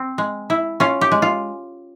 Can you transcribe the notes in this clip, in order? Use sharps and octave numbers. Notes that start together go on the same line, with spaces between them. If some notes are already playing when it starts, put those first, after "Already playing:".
Already playing: C4
G#3
E4
C#4 F4
G4
G#3
F4